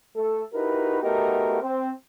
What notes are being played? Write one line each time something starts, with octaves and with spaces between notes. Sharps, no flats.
A3 A4
D#4 E4 F#4 G4 A#4 B4
A3 B3 D#4 F#4 G4 A#4
C4